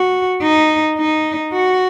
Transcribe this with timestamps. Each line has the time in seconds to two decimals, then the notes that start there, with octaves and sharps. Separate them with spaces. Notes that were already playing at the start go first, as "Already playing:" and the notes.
Already playing: F#4
0.42 D#4
0.98 D#4
1.53 F#4